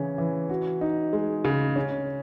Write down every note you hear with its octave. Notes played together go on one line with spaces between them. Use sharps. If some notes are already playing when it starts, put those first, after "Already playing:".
Already playing: C#3 E3 C#4
E3
F#4
D#4
G#3
C#3
C#4